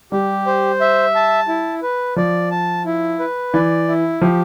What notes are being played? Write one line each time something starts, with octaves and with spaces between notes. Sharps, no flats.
G3 G4
C5
E5
A5
E4
B4
F3 D5
A5
E4
B4
E3 D5
E4
F3 G4